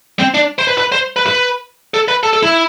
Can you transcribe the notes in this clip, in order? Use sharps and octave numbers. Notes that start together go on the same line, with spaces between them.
C4
D4
C5
B4
B4
C5
B4
B4
A4
B4
A4
A4
E4